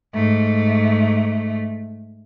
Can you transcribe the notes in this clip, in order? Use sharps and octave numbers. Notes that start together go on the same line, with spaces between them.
G#2 A3